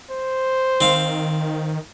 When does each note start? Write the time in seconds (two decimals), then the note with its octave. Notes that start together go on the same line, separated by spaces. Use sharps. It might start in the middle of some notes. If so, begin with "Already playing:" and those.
0.11 C5
0.81 D#3 C4 F5